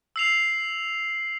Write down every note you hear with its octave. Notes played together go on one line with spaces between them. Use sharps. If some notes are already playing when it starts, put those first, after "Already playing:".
E6 C7 F7